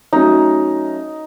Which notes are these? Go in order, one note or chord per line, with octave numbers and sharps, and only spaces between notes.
F#3 A3 C#4 D#4 F#4